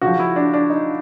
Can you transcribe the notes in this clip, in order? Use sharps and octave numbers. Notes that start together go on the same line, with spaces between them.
C#3 F3 F#4
E4
D4
D4
D#4